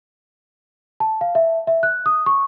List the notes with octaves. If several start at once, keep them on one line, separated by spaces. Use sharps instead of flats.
A5
F5
E5
E5
F#6
D#6
C#6